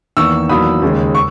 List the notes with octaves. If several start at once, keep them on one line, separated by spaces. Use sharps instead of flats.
E2 D#3 A#3 C#6 E6
E2 D#3 F#3 A#3 B5 D#6
D#2 C#3 G#3
C#6